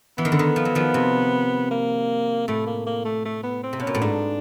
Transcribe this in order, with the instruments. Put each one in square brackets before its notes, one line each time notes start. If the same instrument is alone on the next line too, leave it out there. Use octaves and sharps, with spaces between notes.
[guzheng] E3 [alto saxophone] B3
[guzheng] D#3
D3
D#3
F3
F#3
D#3 F3
C3
[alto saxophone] A#3
[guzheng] A2 [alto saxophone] A3
[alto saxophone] A#3
A#3
A3
A3
B3
C4
[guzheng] C3
[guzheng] B2 [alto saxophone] C#4
[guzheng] A#2
A2
[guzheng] G#2 [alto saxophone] D4